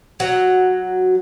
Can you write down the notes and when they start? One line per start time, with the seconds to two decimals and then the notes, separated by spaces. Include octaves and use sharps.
0.20 F#3